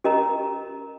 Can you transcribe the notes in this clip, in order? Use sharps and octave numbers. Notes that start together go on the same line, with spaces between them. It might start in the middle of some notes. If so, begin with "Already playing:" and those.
C#4 G4 A#4 D#5 A#5